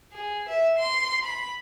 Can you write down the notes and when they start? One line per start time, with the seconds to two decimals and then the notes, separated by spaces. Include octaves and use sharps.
0.12 G#4
0.49 E5
0.78 C6
1.25 B5